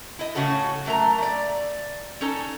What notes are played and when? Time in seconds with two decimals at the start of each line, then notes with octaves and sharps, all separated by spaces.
0.19 E4 D#5
0.35 A2 C#3 C#4 F#4 A4
0.86 F#3 A3 A#4 A#5
1.18 A3 D5
2.21 C#4 D#4 A4